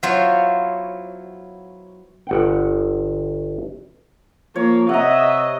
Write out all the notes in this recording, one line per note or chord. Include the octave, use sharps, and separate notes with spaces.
F#3 B3 E4 F4 C5 C#5
G1 F#5 G5
F3 A#3 C#5
C3 D#5 E5 F#5 A#5